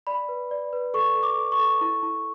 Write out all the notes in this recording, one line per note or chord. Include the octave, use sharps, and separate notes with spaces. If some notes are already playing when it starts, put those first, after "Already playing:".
D5 B5
B4
D5
B4
A4 C#6
A4
D6
A4
C#6
A4
E4
E4